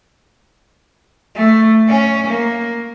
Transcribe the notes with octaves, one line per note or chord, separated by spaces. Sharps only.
A3
C#4
A#3